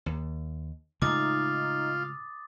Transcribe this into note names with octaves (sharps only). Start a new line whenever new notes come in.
D#2
A2 C#3 G#3 D#4 F4 D6 D#6 A6